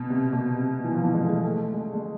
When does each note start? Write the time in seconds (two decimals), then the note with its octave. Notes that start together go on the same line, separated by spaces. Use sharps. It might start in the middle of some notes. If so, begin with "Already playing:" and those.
Already playing: B2
0.10 C3
0.33 B2
0.55 C3
0.84 E3
0.94 F3
1.03 E3
1.14 G#3
1.22 A3
1.29 G#3
1.44 A3
1.74 G#3
1.93 G#3